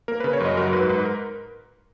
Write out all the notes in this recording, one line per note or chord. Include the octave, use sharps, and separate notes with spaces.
A#3 A#4
B4
C#3
C#5
F#2 D#5
F#3 A#4
G#2 B4
G#2 B4
A#4